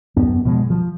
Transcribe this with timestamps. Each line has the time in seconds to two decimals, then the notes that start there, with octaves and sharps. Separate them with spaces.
0.16 F#2 B3
0.45 B2 F3 F#3 G#3
0.70 F3